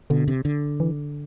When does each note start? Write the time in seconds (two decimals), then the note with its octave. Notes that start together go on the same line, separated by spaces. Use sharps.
0.10 B2 D3
0.28 C3
0.45 D3
0.80 E3